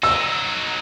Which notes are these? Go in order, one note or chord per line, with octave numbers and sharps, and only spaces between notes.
F#3 D#4 E6